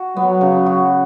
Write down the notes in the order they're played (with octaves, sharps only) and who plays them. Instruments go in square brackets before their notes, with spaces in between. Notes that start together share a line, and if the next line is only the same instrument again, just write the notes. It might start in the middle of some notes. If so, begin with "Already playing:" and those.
Already playing: [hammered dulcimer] F#4
[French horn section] F#3 [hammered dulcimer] B3
[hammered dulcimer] C#3
F#4